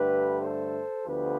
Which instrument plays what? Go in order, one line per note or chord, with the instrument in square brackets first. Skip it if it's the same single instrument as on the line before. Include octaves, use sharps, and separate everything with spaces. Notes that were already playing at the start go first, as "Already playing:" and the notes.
Already playing: [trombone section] G2 D3 A3 G4 B4
A4 C5
D2 D3 F3 B3 G4 B4